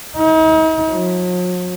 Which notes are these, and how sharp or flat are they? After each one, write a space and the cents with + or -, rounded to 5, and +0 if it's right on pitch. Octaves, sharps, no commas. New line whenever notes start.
D#4 +40
F#3 -45